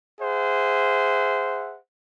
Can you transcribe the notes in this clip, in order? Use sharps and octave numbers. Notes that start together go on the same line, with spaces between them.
G#4 C5 E5 F#5